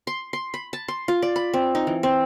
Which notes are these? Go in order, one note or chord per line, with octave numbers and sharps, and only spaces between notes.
C6
C6
B5
A5
C6
F4
D5
B5
C4
D#4
E3
C4